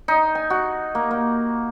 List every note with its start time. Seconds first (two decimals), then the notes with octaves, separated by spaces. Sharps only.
0.08 D#4
0.35 G#5
0.50 F#4
0.95 A#3
1.11 A#3